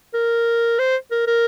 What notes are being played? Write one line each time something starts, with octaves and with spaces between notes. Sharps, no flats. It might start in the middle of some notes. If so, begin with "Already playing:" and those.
A#4
C5
A#4
A#4